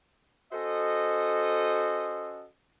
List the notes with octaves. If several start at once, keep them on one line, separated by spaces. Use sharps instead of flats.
C#4 F#4 A4 C5 D#5